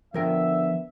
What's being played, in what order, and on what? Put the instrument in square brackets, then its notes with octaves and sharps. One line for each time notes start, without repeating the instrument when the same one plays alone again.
[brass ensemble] D3 B3 E5 [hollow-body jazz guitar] F3 A#4 G5